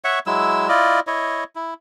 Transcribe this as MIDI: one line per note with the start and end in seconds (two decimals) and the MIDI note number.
0.04 0.19 73
0.04 0.19 76
0.04 0.19 78
0.04 0.19 85
0.26 0.68 54
0.26 0.68 56
0.26 0.68 64
0.26 0.68 88
0.69 1.00 64
0.69 1.00 65
0.69 1.00 74
0.69 1.00 75
1.07 1.44 64
1.07 1.44 73
1.07 1.44 75
1.56 1.74 64